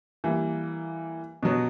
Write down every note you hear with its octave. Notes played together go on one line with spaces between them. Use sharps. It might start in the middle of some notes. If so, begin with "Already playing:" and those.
E3 G3 A#3
B2 F#3 B3